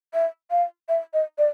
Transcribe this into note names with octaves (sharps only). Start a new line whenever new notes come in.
E5
F5
E5
D#5
D5